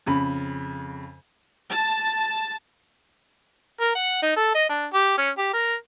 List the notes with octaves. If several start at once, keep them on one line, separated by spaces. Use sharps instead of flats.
F2 C#3 B5
A5
A#4
F#5
D#4
A4
D#5
D4
G4
C#4
G4
A#4